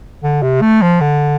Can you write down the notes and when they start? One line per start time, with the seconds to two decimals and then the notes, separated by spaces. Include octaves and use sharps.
0.23 D3
0.43 C3
0.61 A3
0.82 F3
1.01 D3